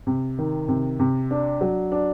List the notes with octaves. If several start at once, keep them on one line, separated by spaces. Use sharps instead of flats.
C3
D#3
C3
C3
D4
F#3
D4